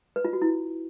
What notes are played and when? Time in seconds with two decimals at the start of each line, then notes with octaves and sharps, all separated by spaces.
0.16 B4
0.25 F4
0.33 F#4
0.42 E4